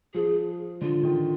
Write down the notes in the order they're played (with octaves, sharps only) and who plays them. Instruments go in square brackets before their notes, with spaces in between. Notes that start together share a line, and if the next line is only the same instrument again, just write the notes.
[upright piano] F3 [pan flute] G#4
[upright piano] D3 [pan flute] F4
[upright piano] D#3